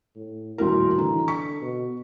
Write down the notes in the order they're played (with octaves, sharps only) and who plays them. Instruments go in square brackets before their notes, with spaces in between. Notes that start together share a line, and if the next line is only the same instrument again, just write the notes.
[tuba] A2
[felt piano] D#1 A2 A#4 [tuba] F2 [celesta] E4 F#4 C6
[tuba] D3 [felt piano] E3 [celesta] A#5
[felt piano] C#6 [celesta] B6
[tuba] B2